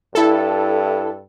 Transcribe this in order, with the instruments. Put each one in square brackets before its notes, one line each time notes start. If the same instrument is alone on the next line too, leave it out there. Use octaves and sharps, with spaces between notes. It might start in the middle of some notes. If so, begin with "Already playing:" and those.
[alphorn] G2 [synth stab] E4 A4